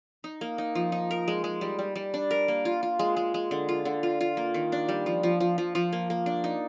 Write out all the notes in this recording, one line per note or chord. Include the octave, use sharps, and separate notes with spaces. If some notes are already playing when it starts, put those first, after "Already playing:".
D#4
A#3
D#4
F3
D#4
A#4
G#3
G#3
G3
G3
G3
D4
A#4
A#3
F4
F4
G#3
G#3
G#3
D3
F4
D3
F4
F4
A#3
D#3
D4
G3
F3
F3
F3
F3
F3
A#3
A#3
D4
D#4